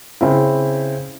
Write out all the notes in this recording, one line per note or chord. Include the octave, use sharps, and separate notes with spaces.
C#3 C4 E4